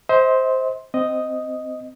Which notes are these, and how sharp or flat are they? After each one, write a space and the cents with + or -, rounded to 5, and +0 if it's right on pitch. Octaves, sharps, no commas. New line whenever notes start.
C5 +0 D#5 +45
C4 -20 D#5 +0